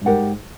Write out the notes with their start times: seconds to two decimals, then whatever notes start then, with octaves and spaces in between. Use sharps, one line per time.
0.01 G2
0.05 G#2 G4 A#4 D5 F#5